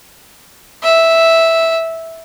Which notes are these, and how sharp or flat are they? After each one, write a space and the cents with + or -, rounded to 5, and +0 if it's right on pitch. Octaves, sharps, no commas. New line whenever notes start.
E5 -5